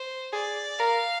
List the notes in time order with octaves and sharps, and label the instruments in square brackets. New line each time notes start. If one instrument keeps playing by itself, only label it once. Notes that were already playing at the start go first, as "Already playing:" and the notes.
Already playing: [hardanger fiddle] C5
[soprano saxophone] G#4 [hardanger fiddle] D5
[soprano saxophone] A#4 [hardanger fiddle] F5